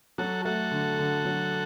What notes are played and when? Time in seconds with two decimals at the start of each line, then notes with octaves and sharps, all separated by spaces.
0.18 F#3 F#4 A4
0.45 A3 F#4 A4
0.71 D3
0.99 D3
1.25 F#3